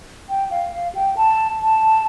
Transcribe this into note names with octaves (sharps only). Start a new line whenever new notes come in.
G5
F5
F5
G5
A5
A5